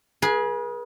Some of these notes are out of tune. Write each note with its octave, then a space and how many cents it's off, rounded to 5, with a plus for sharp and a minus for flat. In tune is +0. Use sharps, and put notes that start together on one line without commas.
G#4 +10 B4 -40